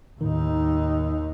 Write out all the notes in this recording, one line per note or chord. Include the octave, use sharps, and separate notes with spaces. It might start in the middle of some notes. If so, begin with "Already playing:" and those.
D#2 A2 D#3 D#4